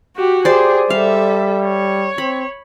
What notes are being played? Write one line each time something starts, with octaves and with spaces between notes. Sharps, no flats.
F#4 G4
G4 G#4 C5 D5
G3 A4 E5 F5
C#5
C4 B5